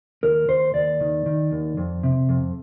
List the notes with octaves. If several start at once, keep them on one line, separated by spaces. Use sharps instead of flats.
D#2 A#4
D#2 C5
D#2 D5
D#3
D#3
D#2
F2
C3
F2